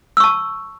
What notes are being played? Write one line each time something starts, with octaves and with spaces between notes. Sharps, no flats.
A5 C#6 E6